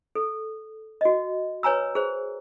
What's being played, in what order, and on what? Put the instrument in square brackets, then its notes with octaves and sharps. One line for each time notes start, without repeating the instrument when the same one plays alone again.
[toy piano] A4
F#4 D#5
B4 C#5 G#5 A#5 E6
G#4 C5